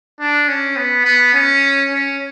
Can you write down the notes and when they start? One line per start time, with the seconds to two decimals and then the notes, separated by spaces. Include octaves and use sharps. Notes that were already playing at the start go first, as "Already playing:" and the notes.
0.20 D4
0.48 C#4
0.76 B3
1.05 B3
1.34 C#4
1.91 C#4